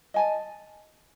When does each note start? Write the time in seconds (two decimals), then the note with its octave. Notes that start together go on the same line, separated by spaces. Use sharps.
0.14 D#5 G#5 A5